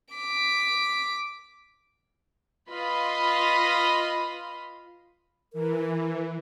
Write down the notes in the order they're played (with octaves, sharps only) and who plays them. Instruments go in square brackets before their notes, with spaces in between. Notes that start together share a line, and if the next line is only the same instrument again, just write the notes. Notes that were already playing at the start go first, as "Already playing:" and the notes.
[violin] D6 B6
[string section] F4 B4 D#5 F5 B5 C6
[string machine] E3 [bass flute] A#4